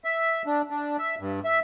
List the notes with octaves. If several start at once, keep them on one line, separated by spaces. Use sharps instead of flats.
E5
D4
D4
E5
G2
E5